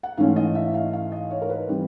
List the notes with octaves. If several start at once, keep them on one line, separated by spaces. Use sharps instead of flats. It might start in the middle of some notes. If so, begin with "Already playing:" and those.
F#5
G#2 E3 A3 C#4 F5
D#5
E5
F5
F5
D#5
C#5
A#4
B4
E3 G3 C4